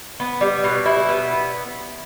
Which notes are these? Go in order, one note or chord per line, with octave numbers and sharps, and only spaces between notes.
B3
G3
B2
E4
B3